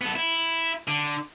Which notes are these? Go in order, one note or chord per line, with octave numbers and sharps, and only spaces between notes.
B3 A4
E4
D3